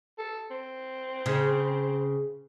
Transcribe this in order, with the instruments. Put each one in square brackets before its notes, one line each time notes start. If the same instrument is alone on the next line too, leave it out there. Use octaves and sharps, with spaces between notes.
[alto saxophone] A4
C4
[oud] C#3